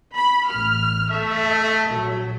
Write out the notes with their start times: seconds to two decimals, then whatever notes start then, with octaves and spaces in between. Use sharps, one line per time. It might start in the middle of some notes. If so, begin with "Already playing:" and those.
0.16 B5
0.49 A1 F6
1.12 A3 A4 E5
1.91 A#1 F#3